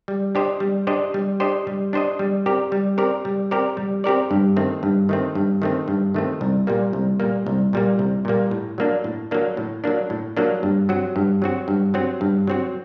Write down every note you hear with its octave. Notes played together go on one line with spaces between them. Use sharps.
G3
D4 G4 C5 D#5
G3
D4 G4 C5 D#5
G3
D4 G4 C5 D#5
G3
D4 G4 C5 D#5
G3
C4 G4 A#4 D5
G3
C4 G4 A#4 D5
G3
C4 G4 A#4 D5
G3
C4 G4 A#4 D5
G2
D#3 A3 C4
G2
D#3 A3 C4
G2
D#3 A3 C4
G2
D#3 A3 C4
C2
A#2 G3 A#3
C2
A#2 G3 A#3
C2
A#2 G3 A#3
C2
A#2 G3 A#3
A2
F#3 A#3 D4
A2
F#3 A#3 D4
A2
F#3 A#3 D4
A2
F#3 A#3 D4
G2
F#3 C4 F#4
G2
F#3 C4 F#4
G2
F#3 C4 F#4
G2
F#3 C4 F#4